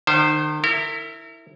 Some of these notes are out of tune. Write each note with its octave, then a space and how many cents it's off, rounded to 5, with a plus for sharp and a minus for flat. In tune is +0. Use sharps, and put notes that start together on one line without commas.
D#3 -40 C5 +0
E4 +0 A#4 -35